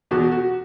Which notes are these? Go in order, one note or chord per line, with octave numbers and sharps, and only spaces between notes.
E2 B2 F#4
F#4